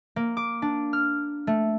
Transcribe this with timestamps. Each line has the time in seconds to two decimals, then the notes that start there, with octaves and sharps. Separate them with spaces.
0.16 A#3
0.37 D6
0.62 D4
0.93 F6
1.47 A3